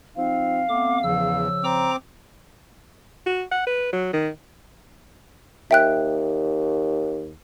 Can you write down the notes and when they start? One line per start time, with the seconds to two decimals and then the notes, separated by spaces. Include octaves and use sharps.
0.16 F3 C4 D#4 F5
0.69 A3 B3 C4 D6
1.03 E2 C#3 F3 E6
1.64 C4 A#5 D6
3.26 F#4
3.52 F#5
3.67 B4
3.93 F#3
4.13 D#3
5.71 D#2 E5 G5 F#6